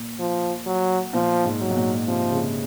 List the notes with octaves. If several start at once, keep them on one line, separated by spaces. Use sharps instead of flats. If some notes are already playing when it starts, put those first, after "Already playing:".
Already playing: A#2
F3
F#3
A#2 F3
G#2
F#3
G#2
A#2
C3 F3
C#3